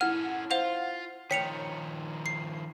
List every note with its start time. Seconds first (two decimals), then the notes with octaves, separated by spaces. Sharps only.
0.01 C#4 E4 A4 F#5 F6
0.51 F4 C5 F5 F#5 F7
1.31 D#3 F3 C#5 G5 B6 C#7 F7
2.26 C7